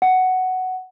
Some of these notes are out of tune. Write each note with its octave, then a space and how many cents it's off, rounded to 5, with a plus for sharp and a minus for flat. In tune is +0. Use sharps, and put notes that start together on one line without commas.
F#5 +5